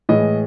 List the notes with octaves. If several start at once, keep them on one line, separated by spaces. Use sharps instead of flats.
A2 E3 G#3 D#5